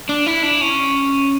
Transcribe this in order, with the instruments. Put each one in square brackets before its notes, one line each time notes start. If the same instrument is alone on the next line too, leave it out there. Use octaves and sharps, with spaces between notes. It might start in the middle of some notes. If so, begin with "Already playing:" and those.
[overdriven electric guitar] D4
E4
D4
C#4